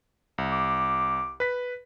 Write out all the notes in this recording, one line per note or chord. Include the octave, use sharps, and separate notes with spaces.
C2
D6
B4 B6